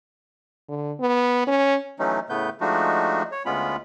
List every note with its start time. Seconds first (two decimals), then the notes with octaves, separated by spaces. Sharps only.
0.69 D3
1.00 B3
1.47 C#4
1.99 E3 F#3 A3 C#4 D#4
2.29 A2 C#3 A3 B3 B4 G6
2.61 F3 G#3 A3 D4 D#4 F#4
3.32 C#5
3.46 D2 G#3 B3 C#4 F4 B5